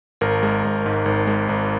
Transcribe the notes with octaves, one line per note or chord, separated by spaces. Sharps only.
G#1 A#4
G#3
G#1
G#2
G#1
G#3
G#1